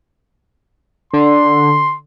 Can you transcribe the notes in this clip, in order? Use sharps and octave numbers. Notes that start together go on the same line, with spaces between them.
D3 C6